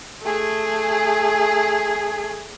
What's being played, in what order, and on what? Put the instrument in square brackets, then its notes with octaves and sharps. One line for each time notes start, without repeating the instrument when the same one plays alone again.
[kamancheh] A3 G#4